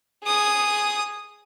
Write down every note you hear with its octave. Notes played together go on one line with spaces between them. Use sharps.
G#4 D#6